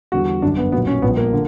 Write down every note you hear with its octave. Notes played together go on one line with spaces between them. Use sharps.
E2 D3 G3 F#4
G1 F#2 D3 D4
B3
B1 A#2 F#3 B3
C#4
A#1 A#2 G3 B3
A#3
D3